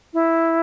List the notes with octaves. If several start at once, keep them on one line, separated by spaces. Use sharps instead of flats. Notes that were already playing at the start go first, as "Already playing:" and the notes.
E4